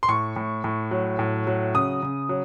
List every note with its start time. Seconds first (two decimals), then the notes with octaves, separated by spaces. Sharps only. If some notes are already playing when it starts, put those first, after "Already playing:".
0.03 C6
0.08 A2 C#6
0.36 A2
0.64 A2
0.91 F#3
1.19 A2
1.47 F#3
1.74 C#3 D#6
2.02 C#3
2.29 F#3